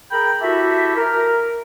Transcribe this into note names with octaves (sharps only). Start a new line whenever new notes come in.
G#4 A#4 G5 A#5 B5
E4 F#4 G4 A4 E5
A#4